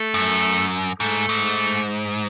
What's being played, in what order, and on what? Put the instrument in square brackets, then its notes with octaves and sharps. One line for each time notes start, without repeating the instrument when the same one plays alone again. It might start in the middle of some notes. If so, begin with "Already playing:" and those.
Already playing: [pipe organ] A3 A4
[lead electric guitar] F#2
[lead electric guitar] G#2 [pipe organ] A3 A4
[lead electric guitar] G#2